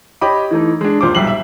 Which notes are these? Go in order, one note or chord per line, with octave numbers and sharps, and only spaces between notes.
G4 C#5 D#5 B5 D6
E3 A3 D#4
G#3 D4
D#1 A#2 C5 D6
B1 G3 E5 C7 F#7
E5